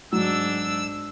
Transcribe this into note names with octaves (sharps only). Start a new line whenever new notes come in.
G#2 F#3 D4 E6